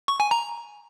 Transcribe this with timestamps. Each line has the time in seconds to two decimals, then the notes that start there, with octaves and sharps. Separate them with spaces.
0.08 C#6
0.20 G#5
0.31 A#5